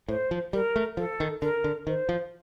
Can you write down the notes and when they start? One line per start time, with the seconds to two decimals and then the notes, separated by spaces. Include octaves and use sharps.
0.08 A2 C5
0.31 F3
0.53 G3 A#4
0.76 A3
0.97 F3 A4
1.20 D#3
1.42 D3 A#4
1.64 D3
1.87 D#3 C5
2.09 F3